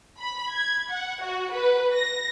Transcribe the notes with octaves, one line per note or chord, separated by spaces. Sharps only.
B5
G#6
F#5
F#4
B4
A#6